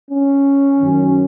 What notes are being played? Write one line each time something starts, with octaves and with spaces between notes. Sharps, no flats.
C#4
F#2 D#3